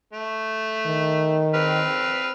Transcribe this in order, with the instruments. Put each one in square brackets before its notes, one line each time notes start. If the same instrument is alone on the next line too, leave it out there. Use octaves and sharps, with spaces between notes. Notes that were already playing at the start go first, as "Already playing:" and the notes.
[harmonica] A3
[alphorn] D#3
[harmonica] C4 B4 F6